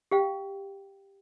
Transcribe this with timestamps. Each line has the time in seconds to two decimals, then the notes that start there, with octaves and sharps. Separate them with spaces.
0.11 G4 F5 G5